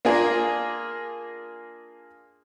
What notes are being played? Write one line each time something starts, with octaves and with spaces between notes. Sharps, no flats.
A#3 D4 F4 G#4 A#4